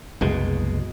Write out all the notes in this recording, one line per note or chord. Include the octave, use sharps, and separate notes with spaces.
F#1 C2 B2 G#3